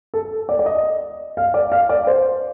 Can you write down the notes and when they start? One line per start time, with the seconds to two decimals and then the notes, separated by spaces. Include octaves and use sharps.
0.14 A4
0.49 D5
0.59 D5
0.66 D#5
1.37 F5
1.54 D5
1.72 F5
1.89 D5
2.07 C5